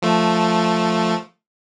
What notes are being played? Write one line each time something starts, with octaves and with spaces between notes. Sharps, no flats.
F3 A3